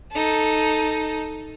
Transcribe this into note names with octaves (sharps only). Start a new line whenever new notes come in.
D#4 A4